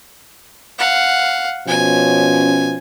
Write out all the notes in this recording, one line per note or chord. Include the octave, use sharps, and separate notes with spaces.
F5 F#5
B2 F3 C#4 G#5